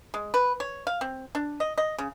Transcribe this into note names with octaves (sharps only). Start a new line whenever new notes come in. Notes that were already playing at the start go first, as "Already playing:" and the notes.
G#3
B4
C#5
F5
C4
D4
D#5
D#5
C#3